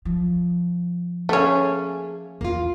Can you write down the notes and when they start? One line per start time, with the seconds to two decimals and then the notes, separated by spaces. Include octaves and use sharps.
0.05 F3
1.29 A3 A#3 C#4 G#4
2.41 E2 A#3 F4